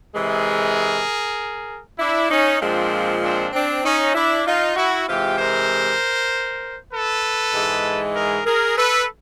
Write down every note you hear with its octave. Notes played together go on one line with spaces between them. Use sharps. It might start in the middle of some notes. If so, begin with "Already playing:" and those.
C3 E3 G#3 G#4 A#4
D4 E4
C#4 D#4
A#2 F3 G#3 C4 D4
C4 D4
C4 D4
C#4 D#4
D4 E4
D#4 F4
E4 F#4
C3 E3 G#3 F4 G4
A#4 C5
A4 B4
G#2 E3 G#3
G#4 A#4
G#4 A#4
A4 B4